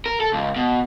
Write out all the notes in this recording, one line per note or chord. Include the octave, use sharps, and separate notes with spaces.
A#4
A4
C#2
B2